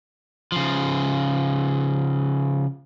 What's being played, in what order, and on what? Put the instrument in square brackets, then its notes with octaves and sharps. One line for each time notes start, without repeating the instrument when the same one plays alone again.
[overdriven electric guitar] C#3 F3